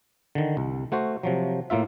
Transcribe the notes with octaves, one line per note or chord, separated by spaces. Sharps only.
D3 D#3
C2
A3 F#4 C5
C3 F3 F#3
A2 A#3 F4 E5